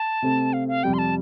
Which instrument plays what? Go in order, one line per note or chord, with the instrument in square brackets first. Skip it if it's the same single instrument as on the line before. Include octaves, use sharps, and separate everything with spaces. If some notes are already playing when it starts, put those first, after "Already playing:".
Already playing: [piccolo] A5
[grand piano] C3 A3 C4
[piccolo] F5
F5
[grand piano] F2 C3 G3 [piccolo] G5
[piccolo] C6
A5